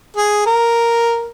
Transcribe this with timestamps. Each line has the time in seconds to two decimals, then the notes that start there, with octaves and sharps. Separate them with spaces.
0.17 G#4
0.46 A#4